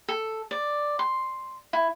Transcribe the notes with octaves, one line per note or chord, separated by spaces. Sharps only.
A4
D5
C6
E4